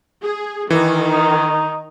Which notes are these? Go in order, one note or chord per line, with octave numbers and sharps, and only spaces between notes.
G#4
D#3 E3
D#4